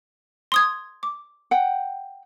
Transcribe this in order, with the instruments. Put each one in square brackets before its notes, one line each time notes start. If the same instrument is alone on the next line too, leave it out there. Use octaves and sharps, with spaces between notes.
[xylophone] C6 D#6 G#6
D6
[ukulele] F#5 G5